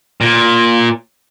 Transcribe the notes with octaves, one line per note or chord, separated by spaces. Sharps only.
A#2